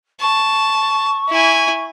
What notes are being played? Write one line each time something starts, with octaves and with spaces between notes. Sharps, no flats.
A5 C#6
E4 G#5